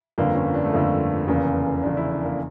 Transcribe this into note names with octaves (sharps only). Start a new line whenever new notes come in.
G1 F2 D3 A#3
C#4
D4
A3
G1 F2 D3 A#3
F1 E2 C#3 A#3
F1 E2 C#3 D4
E4
D4
A#3